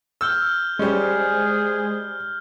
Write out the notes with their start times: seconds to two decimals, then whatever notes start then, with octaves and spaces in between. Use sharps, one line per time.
0.21 E6 F6 G6 G7
0.79 G3 G#3 C#4 G#4 C5